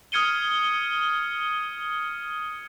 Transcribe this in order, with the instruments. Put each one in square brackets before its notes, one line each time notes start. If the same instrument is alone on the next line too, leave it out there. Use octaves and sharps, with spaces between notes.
[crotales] D#6 F6 G#6 C#7 D#7 G7